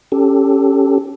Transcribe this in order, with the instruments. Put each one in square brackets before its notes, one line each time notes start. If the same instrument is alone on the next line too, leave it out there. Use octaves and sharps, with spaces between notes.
[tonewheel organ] C#4 G4 A4